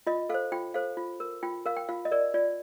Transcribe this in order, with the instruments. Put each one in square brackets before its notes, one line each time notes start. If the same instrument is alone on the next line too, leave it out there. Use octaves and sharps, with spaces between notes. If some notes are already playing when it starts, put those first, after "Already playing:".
[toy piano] F4 D#5
A4 C5 F5
F4 G5
A4 C5 F5
F4
A#4
F4 G5
A#4 F5
G5
F4 F5
D#5
A#4 D5
F4 D5